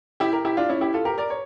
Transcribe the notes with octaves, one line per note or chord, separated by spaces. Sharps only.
E4 G4
G4 A#4
E4 G4
D4 F4
C#4 E4
E4 G4
F4 A4
G4 A#4
A#4 D5
C#5